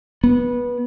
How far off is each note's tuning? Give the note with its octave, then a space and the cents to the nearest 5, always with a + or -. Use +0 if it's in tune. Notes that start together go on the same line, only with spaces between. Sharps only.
B3 -20